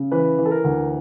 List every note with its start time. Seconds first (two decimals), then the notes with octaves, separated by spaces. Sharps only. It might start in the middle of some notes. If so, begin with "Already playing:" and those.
Already playing: C#3
0.11 E3 B4
0.38 E3
0.45 A4
0.51 A#4
0.64 D2